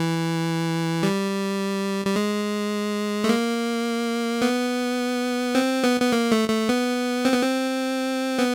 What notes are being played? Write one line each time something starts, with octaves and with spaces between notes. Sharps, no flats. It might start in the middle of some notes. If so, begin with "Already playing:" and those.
Already playing: E3
G3
G3
G#3
A3
A#3
B3
C4
B3
B3
A#3
A3
A3
B3
C4
B3
C4
B3